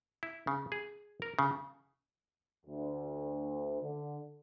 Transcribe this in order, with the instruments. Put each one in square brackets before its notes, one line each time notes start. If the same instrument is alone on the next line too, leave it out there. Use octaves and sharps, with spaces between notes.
[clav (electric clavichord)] E4
C#3
G#4
A#4
C#3
[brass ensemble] D2
D3